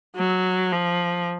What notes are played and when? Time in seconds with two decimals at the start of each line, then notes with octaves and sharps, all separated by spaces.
0.16 F#3
0.73 F3